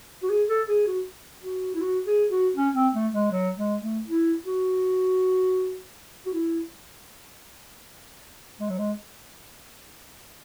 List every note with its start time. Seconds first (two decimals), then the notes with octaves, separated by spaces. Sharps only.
0.23 F#4
0.30 G#4
0.48 A4
0.69 G#4
0.87 F#4
1.43 F#4
1.75 E4
1.81 F#4
2.07 G#4
2.31 F#4
2.56 C#4
2.75 C4
2.94 A3
3.14 G#3
3.32 F#3
3.58 G#3
3.82 A3
4.07 E4
4.45 F#4
6.26 F#4
6.34 E4
8.60 G#3
8.69 F#3
8.78 G#3